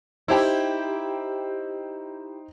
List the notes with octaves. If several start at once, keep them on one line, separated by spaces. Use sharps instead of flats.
D#4 E4 G4 C5 G5